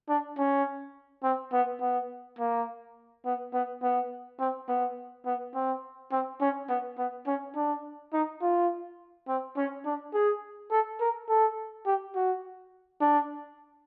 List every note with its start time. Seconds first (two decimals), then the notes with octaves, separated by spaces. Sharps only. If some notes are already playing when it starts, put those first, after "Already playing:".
0.09 D4
0.38 C#4
1.24 C4
1.53 B3
1.81 B3
2.39 A#3
3.25 B3
3.53 B3
3.82 B3
4.40 C4
4.68 B3
5.26 B3
5.55 C4
6.12 C4
6.41 C#4
6.69 B3
6.98 B3
7.27 C#4
7.56 D4
8.13 D#4
8.42 F4
9.28 C4
9.57 C#4
9.85 D4
10.14 G#4
10.71 A4
11.00 A#4
11.29 A4
11.86 G4
12.15 F#4
13.01 D4